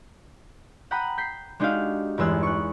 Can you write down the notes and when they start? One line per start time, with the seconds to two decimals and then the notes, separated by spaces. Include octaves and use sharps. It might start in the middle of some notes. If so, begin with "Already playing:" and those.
0.91 F#5 G5 A#5 B5 D#6 F#6
1.17 G6 B6 C7
1.60 G#3 D4 D#4 F#4 G4 F5
2.18 G1 E2 G#3 E6 F#6
2.43 C#6 F#6